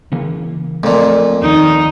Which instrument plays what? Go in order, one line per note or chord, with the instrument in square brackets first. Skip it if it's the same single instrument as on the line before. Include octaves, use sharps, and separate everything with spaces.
[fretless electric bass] C#3 E3 A#3
[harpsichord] F2 A#2 [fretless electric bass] A3
[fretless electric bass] D#2 D#3 [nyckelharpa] D#4